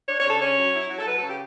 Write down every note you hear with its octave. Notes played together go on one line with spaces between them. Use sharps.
D4 C#5
C#5
C#3
A4
C#4 C#5
F#3
E4
F#3
A4
F#3 B4
A4
C#3
G4